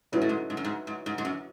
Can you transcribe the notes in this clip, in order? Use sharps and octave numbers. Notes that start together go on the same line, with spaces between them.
G#2 F#3 C#4 E4 B4 D#5
A2
G#2
G#2
F#2
G#2
G#2
G#2
G#2
F#2